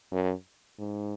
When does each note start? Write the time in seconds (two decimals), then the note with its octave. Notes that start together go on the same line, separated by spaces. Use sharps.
0.12 F#2
0.79 G#2